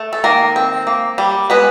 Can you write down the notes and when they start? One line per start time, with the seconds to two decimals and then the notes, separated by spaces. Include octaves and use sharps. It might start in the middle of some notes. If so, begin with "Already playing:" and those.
Already playing: A3
0.13 A4
0.24 D#3 A#3 A#4
0.56 C4
0.87 A#3
1.18 G3
1.50 G#3 B3 B4